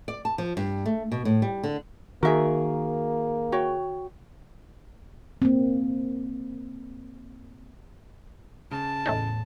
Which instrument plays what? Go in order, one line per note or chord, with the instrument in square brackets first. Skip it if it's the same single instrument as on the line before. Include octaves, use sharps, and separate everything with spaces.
[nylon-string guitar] D5
A5
F3
G2
A3
B2
A2
G3
D3
[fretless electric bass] D#3 [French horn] A#3 [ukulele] F#4 E5 [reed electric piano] G#4 A#4
[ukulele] F#4 C#5 G5
[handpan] A#3 C4
[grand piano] C#3 [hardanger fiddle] A5
[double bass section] E2 A2 [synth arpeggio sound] A3 C#4 D#4